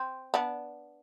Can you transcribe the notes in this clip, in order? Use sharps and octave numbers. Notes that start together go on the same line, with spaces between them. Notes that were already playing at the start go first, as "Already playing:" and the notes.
Already playing: C4
B3 D4